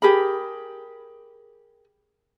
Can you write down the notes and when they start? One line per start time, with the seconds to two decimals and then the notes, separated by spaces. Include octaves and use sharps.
0.02 G4 G#4 A#4 B5